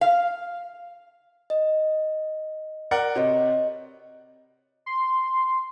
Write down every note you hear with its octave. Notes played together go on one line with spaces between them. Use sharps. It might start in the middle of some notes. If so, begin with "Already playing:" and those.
F5
D#5
A#4 D5 F#5
C3 B4 C#5 D#5
C6